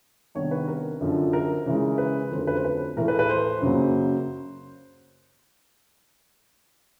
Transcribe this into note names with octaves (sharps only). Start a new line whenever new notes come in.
C3 D#3 G3 B3 D4 C#5
B4
A#4
F#2 D3 F3
A#4
C#3 E3 G#3
B4
F2 D3 F#3 A3 C#4 C5
A#4
B4
C5
B4
A2 E3 A3 A#4
B4
B4
C5
F#2 C#3 F#3 A#3